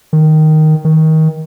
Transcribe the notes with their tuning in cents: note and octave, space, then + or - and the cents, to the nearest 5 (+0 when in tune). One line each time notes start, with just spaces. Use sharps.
D#3 +0
D#3 +25